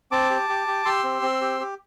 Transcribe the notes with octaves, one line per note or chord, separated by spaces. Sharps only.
C4 A5 D6
G4
G4
G4
G4 C6 E6
C4
C4
G4
G4